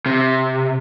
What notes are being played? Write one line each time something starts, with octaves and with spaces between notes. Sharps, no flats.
C3